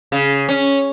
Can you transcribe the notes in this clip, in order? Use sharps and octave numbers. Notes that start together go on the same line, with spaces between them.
C#3
C#4